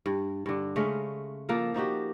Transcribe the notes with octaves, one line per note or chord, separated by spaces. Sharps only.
G2
G2 D3
C#3 G#3 A3 C#4
F3 A#3 A4 A#4
F3 D#4 F#4 G4